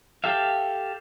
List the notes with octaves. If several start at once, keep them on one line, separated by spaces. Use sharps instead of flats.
G4 A4 E5 F5